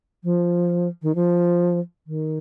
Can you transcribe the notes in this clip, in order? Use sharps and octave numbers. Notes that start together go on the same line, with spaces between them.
F3
D#3
F3
D#3